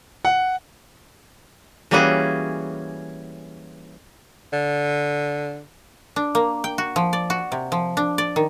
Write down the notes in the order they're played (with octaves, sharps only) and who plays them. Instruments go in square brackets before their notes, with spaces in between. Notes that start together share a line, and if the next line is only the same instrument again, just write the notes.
[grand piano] F#5
[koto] E3 G3 A#3 C#4 F#4 G#4
[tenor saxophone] D3
[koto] D4
A#3
G5
F#4
F3
D5
F#4
C3
F3
D4
D5
D#3